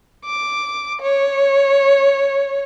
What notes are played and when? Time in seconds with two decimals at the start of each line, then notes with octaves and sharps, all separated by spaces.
0.25 D6
1.01 C#5